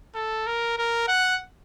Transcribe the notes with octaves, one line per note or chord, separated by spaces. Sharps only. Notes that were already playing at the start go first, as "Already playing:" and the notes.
A4
A#4
A#4
F#5